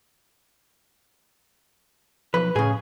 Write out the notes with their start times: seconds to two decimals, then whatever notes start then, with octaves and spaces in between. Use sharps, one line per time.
2.34 B1 F3 B4
2.56 A2 C#3 G#4